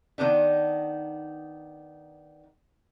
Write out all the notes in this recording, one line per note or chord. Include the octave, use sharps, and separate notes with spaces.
D#3 B3 D4 D#4